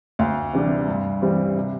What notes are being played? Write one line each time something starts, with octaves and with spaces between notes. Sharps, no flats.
D2 F5
C3 E3 G3 D4
G2
E3 G3 C4
C3